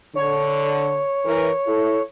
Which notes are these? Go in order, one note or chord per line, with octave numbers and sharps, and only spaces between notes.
D3 C#5
E3 A#4
E4 A4